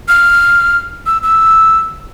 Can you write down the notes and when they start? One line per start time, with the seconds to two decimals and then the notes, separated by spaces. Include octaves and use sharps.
0.08 F6
1.06 E6
1.23 E6